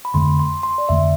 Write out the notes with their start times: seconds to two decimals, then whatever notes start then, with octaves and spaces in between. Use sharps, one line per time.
0.05 B5
0.14 F2 D3 A3 C6
0.39 C6
0.63 C6
0.78 D5
0.89 F2 D3 A3 E5